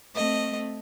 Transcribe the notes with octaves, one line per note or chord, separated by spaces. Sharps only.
A3 C4 D#5